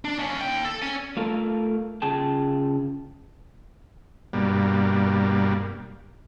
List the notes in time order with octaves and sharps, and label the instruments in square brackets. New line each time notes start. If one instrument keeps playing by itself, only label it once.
[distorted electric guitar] D4
D#2 C#4
D#2 G5
A4
C#4 G#5
[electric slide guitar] A3 F4 A4 A#4 F5
C#3 F4 G#4 G5 A5
[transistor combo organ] G2 B2 G3 A#3